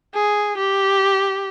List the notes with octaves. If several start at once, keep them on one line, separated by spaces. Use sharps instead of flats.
G#4
G4